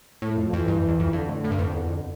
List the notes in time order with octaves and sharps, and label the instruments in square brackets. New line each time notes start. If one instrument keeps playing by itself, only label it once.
[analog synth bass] A2 [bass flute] A3
[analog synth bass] F2 [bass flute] A3
[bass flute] F3
[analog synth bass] F2 [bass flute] E3
[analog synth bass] G2
F2
E2
F2
[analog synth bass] F2 [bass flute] D3
[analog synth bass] A2
A2
G2
F2
E2
F2